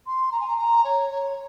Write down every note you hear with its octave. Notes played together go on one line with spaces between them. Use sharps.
C6
A#5
G#5
A#5
A#5
C#5
C#5